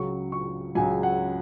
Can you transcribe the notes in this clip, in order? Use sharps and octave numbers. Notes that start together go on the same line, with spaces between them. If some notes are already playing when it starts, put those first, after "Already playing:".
Already playing: C#2 C#3 F#3 C#6
C#6
C#2 C#3 F#3 G#5
F#5